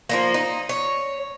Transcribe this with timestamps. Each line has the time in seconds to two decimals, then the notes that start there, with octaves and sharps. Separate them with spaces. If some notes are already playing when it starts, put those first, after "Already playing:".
0.09 F3 F#3 A#3
0.34 D#4
0.69 C#5